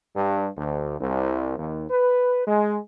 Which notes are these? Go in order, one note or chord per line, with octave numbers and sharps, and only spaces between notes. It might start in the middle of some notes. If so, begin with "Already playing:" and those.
G2
D2
C2
D#2
B4
G#3